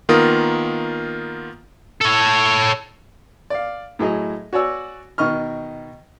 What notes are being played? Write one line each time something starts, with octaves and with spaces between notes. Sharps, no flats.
D#3 A#3 B3 F4 A#4 D#6
A4 C#5
D5 F5
A2 F#3 G#4 D#5
F#4 C#5 D5 G#5 E6
B2 D#3 D#5 C#6 F6